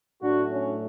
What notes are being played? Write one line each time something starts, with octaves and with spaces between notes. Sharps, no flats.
A2 F#3 A3 D4 F#4
C#4